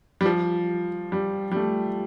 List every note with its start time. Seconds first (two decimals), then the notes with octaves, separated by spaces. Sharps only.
0.21 G3
0.26 F3
1.12 G3
1.52 G3
1.56 A3